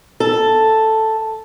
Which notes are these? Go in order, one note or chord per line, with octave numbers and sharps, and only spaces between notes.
A4